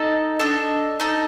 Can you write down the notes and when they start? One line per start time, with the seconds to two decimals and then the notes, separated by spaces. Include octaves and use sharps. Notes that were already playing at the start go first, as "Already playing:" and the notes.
Already playing: D#4 A4 D#5 A5
0.39 D4 A4 D#5
1.00 D#4 A4 D#5